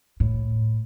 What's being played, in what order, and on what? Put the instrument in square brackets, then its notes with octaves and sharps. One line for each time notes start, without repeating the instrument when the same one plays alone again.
[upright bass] A2